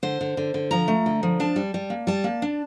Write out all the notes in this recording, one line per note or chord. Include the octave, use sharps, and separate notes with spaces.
D3 C5
D3
D3
D3
F3 A#5
A3
D3
F3
D4 A5
G3
G3
A#3
G3 A5
A#3
D4